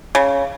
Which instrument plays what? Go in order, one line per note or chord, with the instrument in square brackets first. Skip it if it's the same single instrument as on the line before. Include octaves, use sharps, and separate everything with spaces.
[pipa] C#3